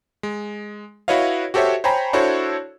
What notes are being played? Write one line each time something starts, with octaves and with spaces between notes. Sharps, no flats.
G#3
E4 F#4 B4 C#5 D#5 F5
F#4 G4 A4 C5 C#5 E5
C5 C#5 G5 G#5 A#5 B5
D4 E4 F#4 A4 C5 C#5